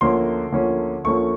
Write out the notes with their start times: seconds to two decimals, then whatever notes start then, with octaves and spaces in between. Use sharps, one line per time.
0.01 D2 D3 F3 A#3 C#4 C6
0.52 D2 D3 F3 A#3 C#4
1.04 D2 D3 F3 A#3 C#4 C#6